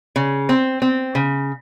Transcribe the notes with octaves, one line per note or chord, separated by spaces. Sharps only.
C#3
C4
C4
C#3